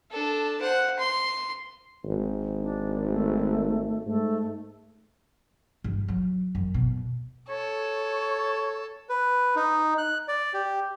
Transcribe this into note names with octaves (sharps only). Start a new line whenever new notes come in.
D4 A4
C5 F#5
C6
G#1
D4
A3
G#2 A3
G2
F#3
F#2
B2
A4 C#5
B4
D#4
F#6
D5
G4